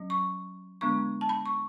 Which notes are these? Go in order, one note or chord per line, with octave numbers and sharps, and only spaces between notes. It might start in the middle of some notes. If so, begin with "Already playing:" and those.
Already playing: F#3 C#4
C#6
D3 G#3 B3 D4 C#6
A5
B5
C#6